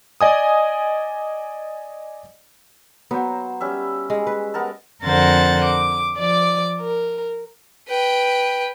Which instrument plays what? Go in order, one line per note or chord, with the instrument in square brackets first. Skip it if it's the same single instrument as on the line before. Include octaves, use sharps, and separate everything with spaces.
[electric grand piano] D5 D#5 G#5 D#6
[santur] F#3 C5 [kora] B3
[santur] G3 C#4 E5
[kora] G#3
B4
[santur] B3 A#4 A5
[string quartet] F2 D3 A#4 C5 F#5 A6
D6
F3 D5 D6
A#4
[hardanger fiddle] B4 G5